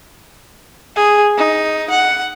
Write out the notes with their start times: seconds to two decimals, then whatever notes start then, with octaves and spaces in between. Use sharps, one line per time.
0.96 G#4
1.37 D#4
1.90 F#5